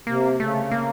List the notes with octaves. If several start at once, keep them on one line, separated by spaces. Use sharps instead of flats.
C3 A#3
C#3 A3
A#3